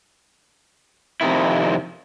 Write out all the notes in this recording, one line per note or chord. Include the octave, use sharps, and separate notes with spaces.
F2 C3 D#3 E4